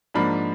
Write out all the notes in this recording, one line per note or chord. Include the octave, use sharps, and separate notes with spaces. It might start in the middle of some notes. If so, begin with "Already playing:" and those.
G#2 F3 A#3 D4 B5